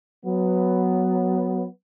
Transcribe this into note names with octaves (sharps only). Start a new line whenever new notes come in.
F#3 B3